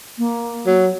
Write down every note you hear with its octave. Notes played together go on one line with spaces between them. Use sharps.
A#3
F#3